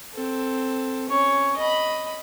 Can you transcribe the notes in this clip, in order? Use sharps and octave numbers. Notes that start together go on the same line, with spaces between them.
C4 A4
C#4 C#5
D#5 B5